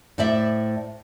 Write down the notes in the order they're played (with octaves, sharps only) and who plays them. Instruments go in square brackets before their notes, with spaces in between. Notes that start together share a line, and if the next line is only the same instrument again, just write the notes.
[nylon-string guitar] A2 C5 D5 E5